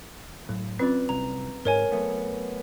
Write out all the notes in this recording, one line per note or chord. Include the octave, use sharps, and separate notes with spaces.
A2 F#3
C4 C#4 F4 B4 C#5 D5
C2 A#5
G#2 A#4 C#5 G#5
F#3 A3 B3